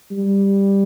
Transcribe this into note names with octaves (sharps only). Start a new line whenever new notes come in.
G3